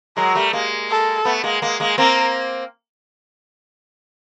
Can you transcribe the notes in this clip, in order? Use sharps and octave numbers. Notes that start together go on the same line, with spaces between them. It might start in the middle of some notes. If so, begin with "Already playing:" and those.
F#3 G#3 A#4
G3 A3
G#3 A#3
A4
A3 B3
G#3 A#3
G#3 A#3
G#3 A#3
A#3 C4 A#4